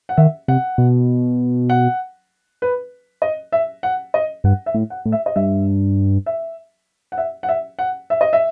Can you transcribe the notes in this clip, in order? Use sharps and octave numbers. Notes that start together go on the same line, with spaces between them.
F#5
D#3 E5
C3 F#5
B2
F#5
B4
D#5
E5
F#5
D#5
G2 F#5
E5
A2
F#5
A2
E5
D#5
G2 E5
E5
F#5
E5
F#5
E5
F#5
E5
D#5
E5